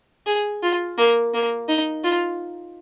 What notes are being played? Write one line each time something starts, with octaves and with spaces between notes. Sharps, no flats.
G#4
F4
A#3
A#3
D#4
F4